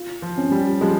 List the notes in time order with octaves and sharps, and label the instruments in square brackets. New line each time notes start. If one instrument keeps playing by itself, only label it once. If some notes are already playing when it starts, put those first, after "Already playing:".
Already playing: [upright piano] F4
[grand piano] F3
[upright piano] C#4
[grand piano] G3
[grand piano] F3 G#3 [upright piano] G3